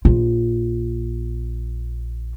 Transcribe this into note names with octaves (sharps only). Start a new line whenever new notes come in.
A#1 F4